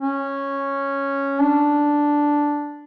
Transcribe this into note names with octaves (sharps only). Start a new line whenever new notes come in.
C#4
D4